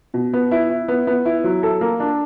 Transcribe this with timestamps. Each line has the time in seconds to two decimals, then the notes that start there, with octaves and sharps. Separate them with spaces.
0.14 B2
0.33 B3
0.51 E4
0.70 E4
0.88 B3
1.07 B3
1.25 E4
1.44 F#3
1.63 A4
1.81 A#3
2.00 D4